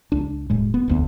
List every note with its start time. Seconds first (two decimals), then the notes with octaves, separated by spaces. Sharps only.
0.12 C#2 D4
0.50 E1 A2 G#3
0.74 B3
0.88 F1 D2 B3